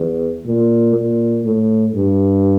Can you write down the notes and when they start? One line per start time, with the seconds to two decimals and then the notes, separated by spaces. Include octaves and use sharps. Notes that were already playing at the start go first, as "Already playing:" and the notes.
Already playing: E2
0.46 A#2
0.95 A#2
1.44 A2
1.93 G2